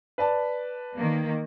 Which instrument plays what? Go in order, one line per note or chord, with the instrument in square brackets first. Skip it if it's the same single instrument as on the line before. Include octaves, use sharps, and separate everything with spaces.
[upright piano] B4 D5 A5
[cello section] D#3 A#3